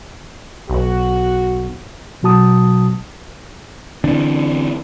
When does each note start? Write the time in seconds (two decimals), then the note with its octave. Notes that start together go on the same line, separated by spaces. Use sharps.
0.70 B1 F#4
2.23 B2 F#3 F#4 A5 D#6
4.04 D3 E3 C4 D4